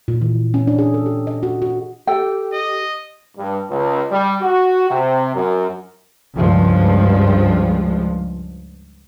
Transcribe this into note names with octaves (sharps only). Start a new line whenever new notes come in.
A#2
E3
C#4
D4
G#4
A4
G4
D#5
F#4
F#4
G4 A4 G5
D#5
G2
C#2
G3
F#4
C3
F#2
C#2 G2 F3 G#3